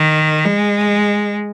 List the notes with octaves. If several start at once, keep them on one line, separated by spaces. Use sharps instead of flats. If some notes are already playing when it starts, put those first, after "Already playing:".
Already playing: D#3
G#3